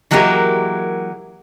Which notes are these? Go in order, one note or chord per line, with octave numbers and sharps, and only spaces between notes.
E3 F#3 G#3 A#3 G4 A#4